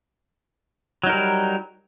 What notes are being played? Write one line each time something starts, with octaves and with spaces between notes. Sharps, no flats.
F#3 G3 D#4 A#4